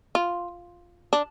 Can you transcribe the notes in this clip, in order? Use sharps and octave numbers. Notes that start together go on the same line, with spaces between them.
F4
D4